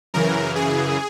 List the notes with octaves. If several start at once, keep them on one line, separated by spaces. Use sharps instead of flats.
F#2 C#3 E3 A#4
G#4